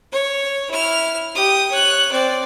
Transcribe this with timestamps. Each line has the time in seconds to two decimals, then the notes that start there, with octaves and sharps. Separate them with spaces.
0.12 C#5
0.70 E4 F6
1.35 G4 D#6
1.71 C#5 F#6
2.12 C4 D5